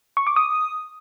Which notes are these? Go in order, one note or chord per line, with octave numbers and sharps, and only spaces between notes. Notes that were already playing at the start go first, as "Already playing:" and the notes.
C#6
D6
D#6